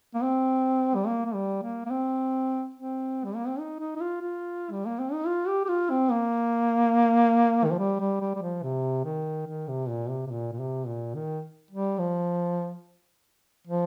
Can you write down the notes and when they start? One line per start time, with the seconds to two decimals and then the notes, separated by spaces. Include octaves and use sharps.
0.15 A#3
0.23 C4
0.95 G3
1.07 A#3
1.25 A#3
1.34 G3
1.63 A#3
1.86 A#3
1.90 C4
2.74 C4
3.25 G3
3.36 A#3
3.47 C4
3.59 D#4
3.80 D#4
3.96 D#4
4.01 F4
4.22 F4
4.72 G3
4.86 A#3
4.99 C4
5.13 D#4
5.27 F4
5.48 G4
5.65 G4
5.69 F4
5.90 C4
6.11 A#3
7.65 D#3
7.72 F3
7.79 G3
8.00 G3
8.21 G3
8.35 G3
8.42 F3
8.63 C3
9.05 D#3
9.47 D#3
9.68 C3
9.89 A#2
10.10 C3
10.27 C3
10.31 A#2
10.53 A#2
10.59 C3
10.87 A#2
11.15 D#3
11.71 G3
11.99 F3
13.67 F3